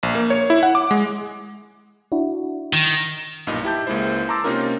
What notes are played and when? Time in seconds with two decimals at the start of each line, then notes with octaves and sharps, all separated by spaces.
0.03 A#1
0.15 A#3
0.30 C#5
0.50 E4
0.63 F#5
0.75 D6
0.91 G#3
2.12 D4 E4 F#4
2.73 D#3
3.47 B1 G2 A#2 D#4 D#5
3.64 E4 G4 A5 G6
3.87 C#2 G#3 A#3 E4 C5
4.28 A5 A#5 C6 D6 E6 A6
4.44 C3 A#3 C#4 D#4 F4 A#4